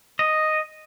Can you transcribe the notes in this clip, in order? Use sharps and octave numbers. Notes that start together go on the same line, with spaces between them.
D#5